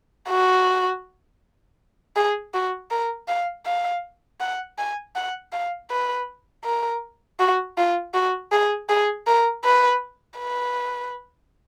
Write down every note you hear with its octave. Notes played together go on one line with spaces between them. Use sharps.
F#4
G#4
F#4
A#4
F5
F5
F#5
G#5
F#5
F5
B4
A#4
F#4
F4
F#4
G#4
G#4
A#4
B4
B4